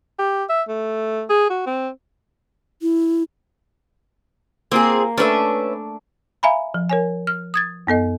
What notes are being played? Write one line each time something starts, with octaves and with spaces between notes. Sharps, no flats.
G4
E5
A3
G#4
F#4
C4
E4
A#3 C4 F4 G#4
A3 C#4 D4 B4 E5
E5 F5 G#5 A#5 B5
F3
A#4 C#5 G#5
F6
D#6 G#6 A6
F#2 B3 A4 D#5